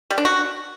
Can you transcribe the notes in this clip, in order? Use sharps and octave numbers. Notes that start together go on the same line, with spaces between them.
G3
D4
F#4